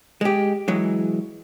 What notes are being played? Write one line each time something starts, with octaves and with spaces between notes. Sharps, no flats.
G#3 G4
E3 F#3 G#3